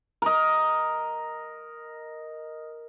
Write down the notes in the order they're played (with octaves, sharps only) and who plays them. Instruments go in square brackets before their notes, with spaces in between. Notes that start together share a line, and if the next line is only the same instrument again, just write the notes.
[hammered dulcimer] A#4 D#5